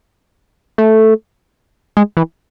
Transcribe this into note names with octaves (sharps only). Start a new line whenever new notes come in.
A3
G#3
E3